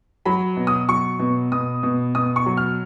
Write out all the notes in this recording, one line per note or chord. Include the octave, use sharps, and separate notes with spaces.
F#3 B5
B2
D#6
F#3 C#6
B2
B2 D#6
B2
B2 D#6
C#6
F#3
F6